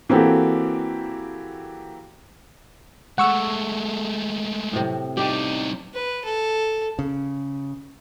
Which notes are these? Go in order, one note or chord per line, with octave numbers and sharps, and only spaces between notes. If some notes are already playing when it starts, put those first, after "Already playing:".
E3 A#3 C4 F#4 G4 A4
G#3 A3 F#5 C#6 E6
A2 C3
G3 D#4 G4
B4
A4
C#3